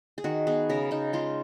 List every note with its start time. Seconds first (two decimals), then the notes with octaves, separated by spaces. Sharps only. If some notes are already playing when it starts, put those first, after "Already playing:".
0.18 G#4
0.24 D#3 F#4
0.47 B3 G#4
0.69 C#3 A#4
0.91 C#3 D#4
1.13 G#3 F4